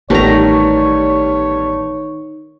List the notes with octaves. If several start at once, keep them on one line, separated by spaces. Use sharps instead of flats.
A1 D#3 G3 A3 B3 C#5 A#5